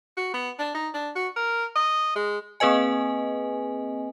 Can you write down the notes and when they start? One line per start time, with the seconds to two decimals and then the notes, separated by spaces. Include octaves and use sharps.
0.17 F#4
0.34 B3
0.59 D4
0.74 D#4
0.94 D4
1.15 F#4
1.36 A#4
1.76 D#5
2.16 G#3
2.60 A#3 C4 G#4 B4 D#5 G#5